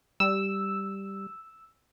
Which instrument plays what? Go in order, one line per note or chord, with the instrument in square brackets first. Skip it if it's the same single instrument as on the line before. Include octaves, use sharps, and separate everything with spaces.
[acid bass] G3 [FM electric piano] E6